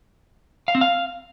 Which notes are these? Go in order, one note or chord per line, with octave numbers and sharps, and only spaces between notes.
F5
C4
F5